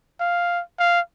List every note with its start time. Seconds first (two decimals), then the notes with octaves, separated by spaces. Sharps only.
0.20 F5
0.79 F5